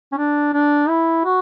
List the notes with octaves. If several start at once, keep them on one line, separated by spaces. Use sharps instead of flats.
C#4
D4
D4
E4
F#4